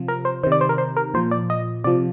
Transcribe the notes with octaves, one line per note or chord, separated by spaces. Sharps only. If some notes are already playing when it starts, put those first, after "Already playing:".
Already playing: C3 F3
A#4
C5
C3 D#3 C5
D5
C5
A#4
C5
A#4
A#2 F3 C5
D5
D#5
C3 F3 D5